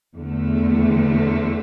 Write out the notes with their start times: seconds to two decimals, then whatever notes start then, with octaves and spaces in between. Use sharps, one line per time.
0.15 E2 D3 A3